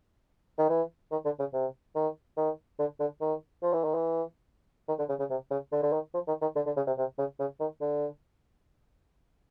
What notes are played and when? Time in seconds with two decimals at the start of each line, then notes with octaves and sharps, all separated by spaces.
0.58 D#3
0.69 E3
1.11 D#3
1.25 D3
1.39 C#3
1.53 C3
1.95 D#3
2.37 D#3
2.79 D3
3.00 D3
3.21 D#3
3.62 F3
3.73 E3
3.84 D#3
3.94 E3
4.88 D#3
4.98 D3
5.09 C#3
5.19 C#3
5.30 C3
5.51 C#3
5.72 D3
5.82 D3
5.92 D#3
6.14 F3
6.27 D#3
6.41 D#3
6.55 D3
6.66 D3
6.76 C#3
6.87 C3
6.98 C3
7.18 C#3
7.39 C#3
7.60 D#3
7.81 D3